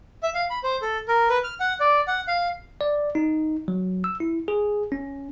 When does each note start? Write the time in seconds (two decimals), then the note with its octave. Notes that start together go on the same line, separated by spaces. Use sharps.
0.23 E5
0.35 F5
0.50 B5
0.64 C5
0.82 A4
1.08 A#4
1.29 B4
1.44 F6
1.60 F#5
1.80 D5
2.07 F#5
2.28 F5
2.81 D5
3.15 D#4
3.68 F#3
4.04 E6
4.20 E4
4.48 G#4
4.92 C#4